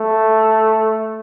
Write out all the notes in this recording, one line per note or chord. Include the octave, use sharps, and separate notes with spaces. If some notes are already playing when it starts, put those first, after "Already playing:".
Already playing: A3